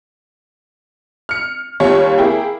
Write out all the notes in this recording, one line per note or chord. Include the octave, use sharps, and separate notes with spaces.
F6 C#7
D#2 G3 F4 C#5
A#3 E4 G#4 G5